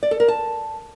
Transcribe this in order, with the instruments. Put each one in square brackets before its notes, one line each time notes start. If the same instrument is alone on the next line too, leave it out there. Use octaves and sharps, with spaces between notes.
[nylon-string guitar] D5
A4
A#4
A5